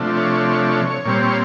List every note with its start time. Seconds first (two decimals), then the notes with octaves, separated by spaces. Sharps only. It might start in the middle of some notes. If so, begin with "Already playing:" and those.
Already playing: C3 F3 A3 D4
0.17 C#5
1.05 A#2 G3 C4